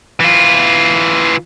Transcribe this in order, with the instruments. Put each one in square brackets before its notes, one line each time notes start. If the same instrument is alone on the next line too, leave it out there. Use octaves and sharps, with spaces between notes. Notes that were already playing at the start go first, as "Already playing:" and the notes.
[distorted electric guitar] E3 F4